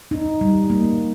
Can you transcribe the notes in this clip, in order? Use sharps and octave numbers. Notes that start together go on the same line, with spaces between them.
D#4
G3
A#3
G3